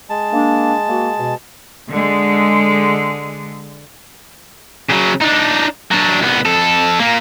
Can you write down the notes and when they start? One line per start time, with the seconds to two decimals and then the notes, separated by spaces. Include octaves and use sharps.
0.10 G#3 A5
0.33 A#3 D4
0.89 A#3 F#4
1.18 B2
1.90 D3 G#3
4.90 C#3 F#3
5.22 D4 D#4
5.92 F#3 D4
6.22 C2 B3
6.46 F2 A4
7.00 A#2 A#3